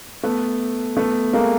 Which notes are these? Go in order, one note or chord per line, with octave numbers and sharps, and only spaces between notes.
A3 B3
A3 B3
G#3 A#3